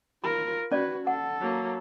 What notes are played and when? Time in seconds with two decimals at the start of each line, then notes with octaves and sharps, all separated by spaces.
0.24 F4 A#4 B5
0.72 C#4 F#4 B4 D5
1.07 A4 F#5
1.41 F#3 A#3